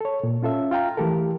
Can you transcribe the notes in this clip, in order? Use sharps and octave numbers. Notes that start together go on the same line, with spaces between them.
A4 C#5
A#2
C#4 F4 A4 E5
F4 F5 G5 A#5
E3 F3 A3 G4 A4 A#4